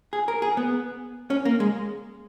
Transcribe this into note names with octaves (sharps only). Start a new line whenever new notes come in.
G#4
A#4
G#4
B3
C#4
A#3
G#3